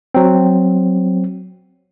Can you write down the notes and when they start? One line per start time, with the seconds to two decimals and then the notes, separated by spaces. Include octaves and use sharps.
0.14 F#3 C4